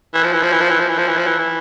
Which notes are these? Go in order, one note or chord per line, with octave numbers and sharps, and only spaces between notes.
E3
F3
E3
F3
E3
F3
E3
F3
E3
F3
E3
F3
E3
E3